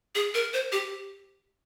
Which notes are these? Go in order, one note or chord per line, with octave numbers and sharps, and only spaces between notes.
G#4
A#4
C5
G4